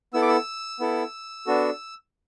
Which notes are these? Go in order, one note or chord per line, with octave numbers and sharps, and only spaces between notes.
B3 E4 A4 E6
D6
E6
B3 E4 A4
B3 D4 F#4 A4